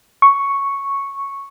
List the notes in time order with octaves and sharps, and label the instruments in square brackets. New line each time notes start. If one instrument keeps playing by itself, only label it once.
[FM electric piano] C#6